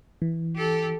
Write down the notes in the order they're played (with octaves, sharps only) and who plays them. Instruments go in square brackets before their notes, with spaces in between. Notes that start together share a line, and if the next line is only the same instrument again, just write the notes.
[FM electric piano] E3
[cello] G4 A4